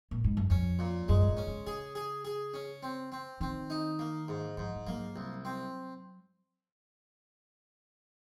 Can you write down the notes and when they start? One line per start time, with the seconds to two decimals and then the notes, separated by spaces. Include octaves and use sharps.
0.11 A#2
0.24 G#2
0.37 F#2
0.50 F2 C#4
0.79 A#2
1.08 F#2 G#3
1.28 G#2
1.37 C#4
1.47 C#3
1.66 C#3 G#4
1.95 G#4
2.25 G#4
2.54 C#4
2.83 C4
3.12 C4
3.40 D#3 C4
3.70 D#4
3.99 A#3
4.28 G#2
4.57 G#2 F3
4.76 F3
4.86 F#3 A#3
5.16 C2
5.45 C4